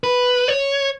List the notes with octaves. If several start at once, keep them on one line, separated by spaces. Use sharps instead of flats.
B4
C#5